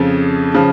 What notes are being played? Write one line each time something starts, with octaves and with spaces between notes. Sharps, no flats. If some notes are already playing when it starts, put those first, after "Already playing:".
Already playing: F2 C#3 F3
C#3 F3